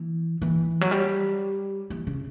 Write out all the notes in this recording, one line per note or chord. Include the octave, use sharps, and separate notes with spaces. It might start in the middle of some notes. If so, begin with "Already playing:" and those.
Already playing: E3
E3
F#3
G3
E3
C#3